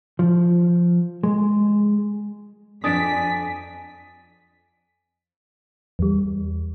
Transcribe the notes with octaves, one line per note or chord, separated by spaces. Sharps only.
F3
G#3
F2 D4 G#5 D#6 A6 B6 D7
E2 G3